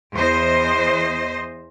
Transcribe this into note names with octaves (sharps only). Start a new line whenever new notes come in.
E2 C5 D#5